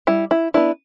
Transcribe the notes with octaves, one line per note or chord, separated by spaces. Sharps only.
G3 E4
E4
B3 D4 E4